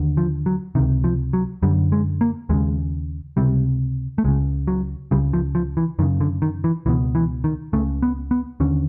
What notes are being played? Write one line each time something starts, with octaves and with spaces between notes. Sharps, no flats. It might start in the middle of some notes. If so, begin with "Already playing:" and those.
Already playing: D#2 D3
F3
F#3
C#2 C3 D#3
F3
F#3
F#2 D3 G3
G#3
A#3
D#2 C#3 G#3
C#2 C3 G3
A3
C#2 C#3 G#3
F#3
C#2 C#3 G3
F3
F3
E3
F#2 C#3 D#3
D3
D#3
E3
C#2 B2 E3
E3
D#3
C#2 C#3 A3
B3
B3
D#2 D3 C#4